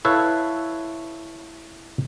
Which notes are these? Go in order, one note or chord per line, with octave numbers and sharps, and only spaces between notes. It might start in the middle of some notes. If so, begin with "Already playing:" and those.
E4 A4 B4 C#5 E5 F5